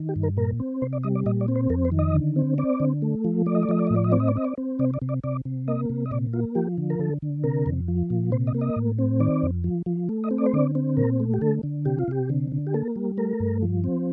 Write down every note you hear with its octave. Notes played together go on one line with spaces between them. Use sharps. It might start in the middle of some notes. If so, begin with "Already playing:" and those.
Already playing: D#3
G4
G2
A#4
A#2 A#4
C4
C3 C5
D5
G3 D#5
D5
A#2 D#5
D5
C4
C5
F2 A#4
C5
D#3
D#5
D3
C4
C4 D5
D3
A3
F3
A3 D5
D#5
D5
F3 D#5
D5
D#5
A2
D5
D#5
C4 D5
D#5
D5
C4 D#5
D5
C4
C3 D5
D5
C3
D5
C3 D5
C3
A#3 D#5
C3
D#5
A#2 D5
A#3 F4
F3 G4
D3
A#4
D3 A4
D3
C3 A#4
F2
F3
A#2
C3 C5
D#5
A#3
D#5
A2
C4
D#3 D5
F2
F3
F3
A3
D#5
C4
D5
C5
D3 D5
C4
A#2 A#4
A3
G4
D3 A4
D3
C3 G4
F4
C3 G4
D3
D3
G4
A#3 A4
G3
A3 A#4
G2
F3
C4